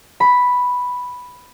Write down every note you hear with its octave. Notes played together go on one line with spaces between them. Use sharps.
B5